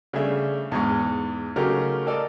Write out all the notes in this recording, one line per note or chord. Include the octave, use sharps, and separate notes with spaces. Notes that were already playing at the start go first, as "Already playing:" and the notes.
C#3 G3 A3 D4 G#4 E5
E2 G#2 C#6
C#3 F#3 A3 D#4 G4 A#4
A4 A#4 D5 D#5